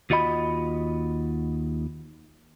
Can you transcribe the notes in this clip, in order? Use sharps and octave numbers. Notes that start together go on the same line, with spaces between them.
D#2 F4 F#4 D#5 B5